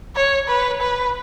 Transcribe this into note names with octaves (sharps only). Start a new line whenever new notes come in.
C#5
B4
B4